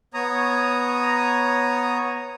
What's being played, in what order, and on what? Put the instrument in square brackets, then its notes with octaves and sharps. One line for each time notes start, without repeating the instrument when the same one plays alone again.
[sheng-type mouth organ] B3 C#5 A#5 D#6